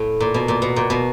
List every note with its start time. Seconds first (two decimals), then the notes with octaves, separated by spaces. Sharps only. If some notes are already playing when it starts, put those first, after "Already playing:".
Already playing: A2
0.20 A#2
0.34 B2
0.48 A#2
0.62 B2
0.76 A#2
0.90 B2